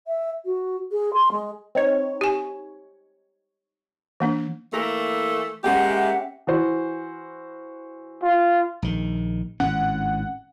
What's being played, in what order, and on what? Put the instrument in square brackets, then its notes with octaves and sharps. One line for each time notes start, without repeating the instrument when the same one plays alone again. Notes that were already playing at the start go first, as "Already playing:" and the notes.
[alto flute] E5
F#4
G#4
C6
G#3
[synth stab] C4 D#4 C#5
[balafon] G4 G#5
E3 A#3 D4
[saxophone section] E3 A3 A#3 [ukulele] A#4
[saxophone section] G#3 A#3 G4 [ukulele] C#4 G#4 G5 [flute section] E5 F#5
[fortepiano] E3 F#4 C5
[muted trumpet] F4
[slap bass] A#1 D#3
[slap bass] G#1 A2 C#4 [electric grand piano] F#5